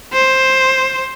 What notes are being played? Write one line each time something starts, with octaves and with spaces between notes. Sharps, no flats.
C5